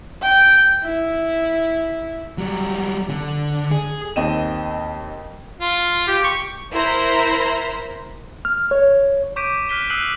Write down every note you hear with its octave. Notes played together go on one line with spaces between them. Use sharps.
G5
E4
F#3 G3
D3
G#4
D#2 C4 D#5 G5 D#7 E7
F4
G4
C#6
E4 A#4 C5 A#5 B5
F6
C#5
C#6 D6 G6 B6 D7 D#7
B6
F6 F#6 B6 D#7 G7
D#6 E6 F#6 C7 D#7 F#7
D#6